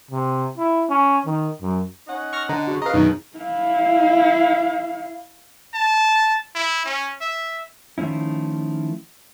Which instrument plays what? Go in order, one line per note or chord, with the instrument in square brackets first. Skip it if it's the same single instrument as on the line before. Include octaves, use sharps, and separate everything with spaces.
[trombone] C3
E4
C#4
D#3
F#2
[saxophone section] C#4 D#4 F#5
[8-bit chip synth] C#6 F6 A#6
[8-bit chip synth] D3 [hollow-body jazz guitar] D#5 A#5
[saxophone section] C#3 [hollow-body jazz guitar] F#4
[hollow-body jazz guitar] B4 A#5 [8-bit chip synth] D#5 F5
[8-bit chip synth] F#2 B2 D#3 [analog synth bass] D#4
[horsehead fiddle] E4 F5
[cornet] A5
E4
C#4
E5
[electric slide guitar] D#3 F3 A3 C#4 E4